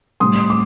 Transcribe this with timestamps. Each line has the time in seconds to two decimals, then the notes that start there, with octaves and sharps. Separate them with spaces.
0.20 A2 G3 C4 C6 D#6
0.50 D6